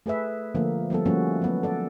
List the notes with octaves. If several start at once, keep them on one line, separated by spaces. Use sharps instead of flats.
A3 G#4 B4 E5
D3 F3 A3 A#3
F3 G3 B3 A4
F3 G3 A3 A#3 C#4 F#4
F#3 B3
A4 D5